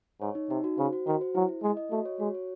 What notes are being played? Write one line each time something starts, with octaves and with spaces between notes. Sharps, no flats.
G#2 C#5
D#4
C3 D#4
F#4
C#3 C5
F#4
D#3 F#4
C5
F#3 E4
E4
G#3 D#5
D#5
A3 F#4
C#5
G#3 F#4
C#5